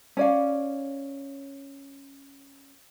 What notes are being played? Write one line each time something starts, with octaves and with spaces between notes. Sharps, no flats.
C#4 D5 F5